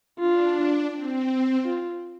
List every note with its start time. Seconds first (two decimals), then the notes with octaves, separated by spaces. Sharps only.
0.19 D4 F4
0.92 C4
1.65 F4